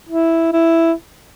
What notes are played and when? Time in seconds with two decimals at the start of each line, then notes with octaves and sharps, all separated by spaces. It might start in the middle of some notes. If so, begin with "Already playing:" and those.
0.09 E4
0.53 E4